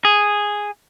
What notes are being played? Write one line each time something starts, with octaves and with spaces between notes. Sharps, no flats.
G#4